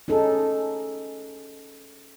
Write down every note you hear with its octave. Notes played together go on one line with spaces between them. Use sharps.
C#4 D#4 G#4 A4